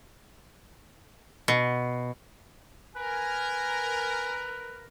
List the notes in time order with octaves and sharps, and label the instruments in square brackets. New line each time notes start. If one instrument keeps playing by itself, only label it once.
[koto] B2
[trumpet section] A#4 [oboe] B4 [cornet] G#5